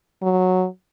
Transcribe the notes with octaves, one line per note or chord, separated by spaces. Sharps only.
F#3